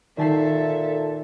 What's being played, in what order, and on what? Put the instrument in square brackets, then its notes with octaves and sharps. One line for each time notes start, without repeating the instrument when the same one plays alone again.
[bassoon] A#2 [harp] D#3 A5 C7 [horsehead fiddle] A4 E5